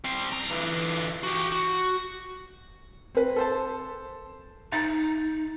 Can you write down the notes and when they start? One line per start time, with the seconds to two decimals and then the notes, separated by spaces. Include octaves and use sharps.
0.04 G3 C4
0.32 C2 A#5
0.51 D3 E3
1.23 F#4 G4
1.52 F#4
3.15 C4 B4
3.36 A4 C5 A5
4.72 D#4 A#5 A6